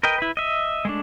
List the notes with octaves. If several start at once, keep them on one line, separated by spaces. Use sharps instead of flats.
A#4 B4 D#5 G5
E4 B4
D#5 E5
G#3 A3 D4